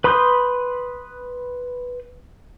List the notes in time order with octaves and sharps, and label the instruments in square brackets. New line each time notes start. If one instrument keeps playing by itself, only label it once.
[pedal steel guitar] B4 B5 C6 D#6 G6